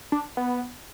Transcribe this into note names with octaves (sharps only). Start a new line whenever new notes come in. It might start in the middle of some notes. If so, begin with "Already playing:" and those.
D4
B3